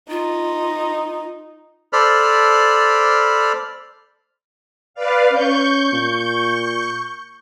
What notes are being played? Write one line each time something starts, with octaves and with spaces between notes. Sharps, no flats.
D#4 F4
A4 C5 D5 B5 F6
B4 D5 F5
C#4 C#6 G6
A#2